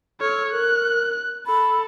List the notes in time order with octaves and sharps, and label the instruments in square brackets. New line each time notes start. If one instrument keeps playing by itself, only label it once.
[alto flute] A4 [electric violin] C#5 F6
[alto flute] A#4 [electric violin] F#6
[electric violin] A4 [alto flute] B5